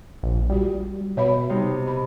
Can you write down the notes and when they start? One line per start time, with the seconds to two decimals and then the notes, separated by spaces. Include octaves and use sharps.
0.23 A#1
0.50 G3 F4 F#4
1.17 B2 C#5 E5 B5
1.50 C3 G3 D#4
1.87 B5